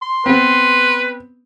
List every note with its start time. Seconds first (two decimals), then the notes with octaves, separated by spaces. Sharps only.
0.02 C6
0.26 B3 C4 B4